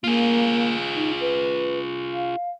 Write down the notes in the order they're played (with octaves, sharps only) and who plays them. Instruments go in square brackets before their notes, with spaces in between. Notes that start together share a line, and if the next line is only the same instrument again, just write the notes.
[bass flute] A#3 [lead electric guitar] F4 G#4
[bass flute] D#4
B4
F5